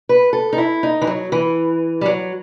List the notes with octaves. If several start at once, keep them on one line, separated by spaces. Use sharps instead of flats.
B4
A4
D#4
E4
D#4
E3
F#3
E3
G3
F#3